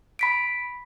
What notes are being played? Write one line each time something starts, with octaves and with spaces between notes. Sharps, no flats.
B5 B6 D7